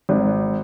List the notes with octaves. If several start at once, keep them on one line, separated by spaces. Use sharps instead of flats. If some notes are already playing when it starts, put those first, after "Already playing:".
G#1